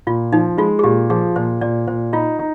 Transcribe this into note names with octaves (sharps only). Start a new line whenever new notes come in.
A#2 F4
F3 D#4
G#3 F4
G#4
A#2 G4
F3 G#4
A#2 C5
A#2 D5
A#2 C5
D#4 F4
D#4